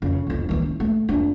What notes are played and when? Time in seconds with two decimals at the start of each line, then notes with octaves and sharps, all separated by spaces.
0.02 F2 C#3
0.27 G1 F2
0.49 D#3 E3
0.62 C#4
0.80 A3
1.09 F2 D4